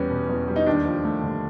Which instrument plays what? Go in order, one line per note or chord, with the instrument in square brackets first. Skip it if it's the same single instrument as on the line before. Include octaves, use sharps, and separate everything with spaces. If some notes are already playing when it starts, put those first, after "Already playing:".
Already playing: [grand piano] E2 G3 B3 [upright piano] C#4
[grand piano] B2
E2
G3
[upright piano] D#4
[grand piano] D#2 [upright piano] D4
[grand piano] F3
A3
D3